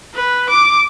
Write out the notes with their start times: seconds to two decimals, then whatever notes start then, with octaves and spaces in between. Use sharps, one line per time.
0.15 B4
0.49 D6